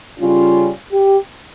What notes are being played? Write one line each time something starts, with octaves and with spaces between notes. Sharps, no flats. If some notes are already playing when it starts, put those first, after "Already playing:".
C#3 G3 C#4 F4
G4